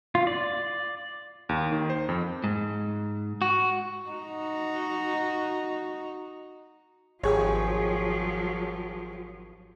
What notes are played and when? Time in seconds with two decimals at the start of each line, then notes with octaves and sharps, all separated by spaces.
0.15 F4
0.27 D5
1.49 D#2
1.72 D#3
1.90 C5
2.09 F2
2.44 G#2
3.42 F#4
4.09 D#4 F#4
7.23 G#1 F3 F#3 G4 G#4 C#5